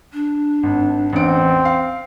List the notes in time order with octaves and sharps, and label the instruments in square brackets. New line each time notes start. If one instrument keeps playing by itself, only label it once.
[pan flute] D4
[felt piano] G#1
[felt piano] A1 E2 D7 [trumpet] C4
[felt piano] F5 C7